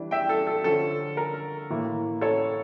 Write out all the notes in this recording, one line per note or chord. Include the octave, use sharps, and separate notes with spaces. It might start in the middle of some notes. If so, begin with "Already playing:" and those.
Already playing: E3 G3 D4
E5 G5
A4
A4
D3 F3 C#4 A4
A#4
A2 E3 A#3
A4 C#5